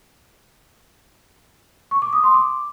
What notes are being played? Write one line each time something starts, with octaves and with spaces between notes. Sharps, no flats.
C#6
D6
D#6
C6
D6